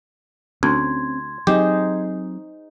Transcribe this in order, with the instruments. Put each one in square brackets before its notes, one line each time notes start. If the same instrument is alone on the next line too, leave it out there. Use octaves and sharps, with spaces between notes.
[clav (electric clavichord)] D2 [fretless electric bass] C4 C#4 [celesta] C6 G#6
[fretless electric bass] F#3 C4 [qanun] D#4 G#4 C5 [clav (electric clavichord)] G4